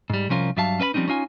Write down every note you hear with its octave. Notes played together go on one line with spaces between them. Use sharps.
G#2 G3
C2 F3 C#4 F4 A#4
G2 F#3 E5 F5 A5
C#4 B4 E5 B5
F3 G3 C4 C#4 D#4
C#4 D#4 F4 G#5